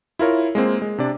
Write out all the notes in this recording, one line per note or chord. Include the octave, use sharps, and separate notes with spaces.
E4 F4 A#4 C#5
G#3 A#3 C4
G#3
C3 D4 D5